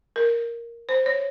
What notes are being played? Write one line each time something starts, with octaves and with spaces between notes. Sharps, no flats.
A#4
C5
C#5